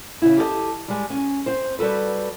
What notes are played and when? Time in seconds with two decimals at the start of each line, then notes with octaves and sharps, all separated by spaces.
0.22 C#3 E4
0.38 G4 A4 C#5 D#5
0.88 G3 G#3
1.10 C#4
1.46 C4 C5
1.79 G3 F#4 A4 B4